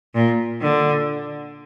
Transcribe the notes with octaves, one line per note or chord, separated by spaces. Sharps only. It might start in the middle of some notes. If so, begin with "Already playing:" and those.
A#2
D3